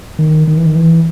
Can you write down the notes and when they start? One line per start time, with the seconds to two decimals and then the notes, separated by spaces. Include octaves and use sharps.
0.19 D#3
0.47 D#3
0.57 E3
0.66 D#3
0.76 E3